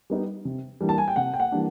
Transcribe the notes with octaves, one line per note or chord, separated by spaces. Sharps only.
G3 B3 D#4
C3
E3 G3 A#3 D4
A5
G#5
G5
C3 F#5
G5
F#5
E3 G3 A#3 D4